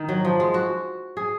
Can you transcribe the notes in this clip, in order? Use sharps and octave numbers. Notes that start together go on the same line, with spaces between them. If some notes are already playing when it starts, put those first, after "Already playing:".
Already playing: D#3
F#3
F3
G#3
F#4
G#4